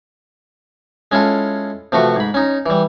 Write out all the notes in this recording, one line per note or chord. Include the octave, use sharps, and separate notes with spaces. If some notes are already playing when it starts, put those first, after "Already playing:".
G#3 C#4 E4 F4 A4
C3 F3 A3 F#4 B4 C#6
G#2 B5
C#4 D#4
E3 G3